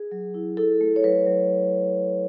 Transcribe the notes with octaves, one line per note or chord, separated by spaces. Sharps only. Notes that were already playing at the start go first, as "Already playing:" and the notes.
Already playing: G#4
F#3
E4
E4 A4
A3
C#5
F#3 B4
F#3